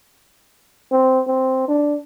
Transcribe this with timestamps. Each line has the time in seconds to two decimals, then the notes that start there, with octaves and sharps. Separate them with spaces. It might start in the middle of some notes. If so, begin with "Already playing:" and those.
0.91 C4
1.27 C4
1.68 D4